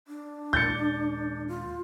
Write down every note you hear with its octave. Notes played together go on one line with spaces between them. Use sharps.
D4
D#2 A#2 G#3 G6 A6 C#7
F4